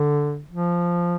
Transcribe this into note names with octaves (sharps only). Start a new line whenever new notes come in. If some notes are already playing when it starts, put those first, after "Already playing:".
Already playing: D3
F3